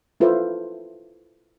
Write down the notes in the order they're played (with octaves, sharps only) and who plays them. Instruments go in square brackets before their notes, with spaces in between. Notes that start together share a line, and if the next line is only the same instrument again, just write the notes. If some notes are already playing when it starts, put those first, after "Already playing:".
[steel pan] E4 F4 A4 B4 C5 E5